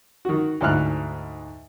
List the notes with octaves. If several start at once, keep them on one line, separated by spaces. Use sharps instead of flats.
D#3 F#4
D2 G#2 E4 F6 F#6